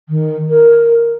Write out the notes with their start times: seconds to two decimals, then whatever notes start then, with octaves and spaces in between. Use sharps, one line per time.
0.09 D#3
0.50 A#4